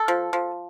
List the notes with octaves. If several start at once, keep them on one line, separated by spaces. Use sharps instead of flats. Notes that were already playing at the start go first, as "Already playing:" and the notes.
Already playing: A4
F3
F3